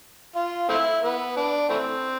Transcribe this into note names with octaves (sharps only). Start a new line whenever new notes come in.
F4
A3 C4 E4
B3
D4
E3 A3 C4